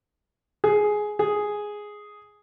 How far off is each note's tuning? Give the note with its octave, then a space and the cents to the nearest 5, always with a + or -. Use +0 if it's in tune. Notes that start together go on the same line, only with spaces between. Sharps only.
G#4 +10
G#4 +0